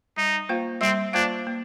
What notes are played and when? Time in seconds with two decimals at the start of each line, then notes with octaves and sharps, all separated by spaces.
0.17 G3 D#4
0.49 A#3 F4 C5 F5
0.82 G3 C4
1.13 A#3 D4 F4 C5 F5
1.47 A#3